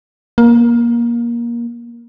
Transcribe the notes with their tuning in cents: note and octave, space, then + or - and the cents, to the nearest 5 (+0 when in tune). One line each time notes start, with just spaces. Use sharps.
A#3 +20